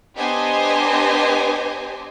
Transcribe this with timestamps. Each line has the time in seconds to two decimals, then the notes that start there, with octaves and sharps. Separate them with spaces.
0.17 B3 D4 G4 C5 D#5 G#5